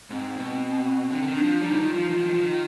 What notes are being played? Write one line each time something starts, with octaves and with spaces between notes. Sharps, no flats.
G#2 C4
B2
D3 C4
D3
D#3
D4
F3
G3 D#4
D3
D#3
F4
F3
D#3
F3
D#3
F3
D#3